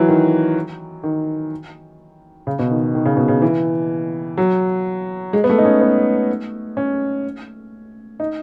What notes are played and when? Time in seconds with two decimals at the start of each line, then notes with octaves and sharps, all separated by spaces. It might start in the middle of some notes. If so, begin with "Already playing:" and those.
Already playing: E3 F#3
0.08 D#3
1.03 D#3
2.47 C#3
2.59 B2
2.71 D#3
2.95 D#3
3.05 C#3
3.17 B2
3.28 C#3
3.42 E3
4.38 F#3
5.33 G#3
5.44 B3
5.49 A3
5.58 D#4
5.65 C#4
5.81 B3
6.77 C#4
8.20 D#4